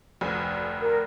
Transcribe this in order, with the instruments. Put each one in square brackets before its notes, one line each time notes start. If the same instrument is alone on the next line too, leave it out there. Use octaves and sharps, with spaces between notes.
[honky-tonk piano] F1 D2
[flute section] A#4